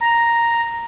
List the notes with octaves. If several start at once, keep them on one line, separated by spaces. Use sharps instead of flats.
A#5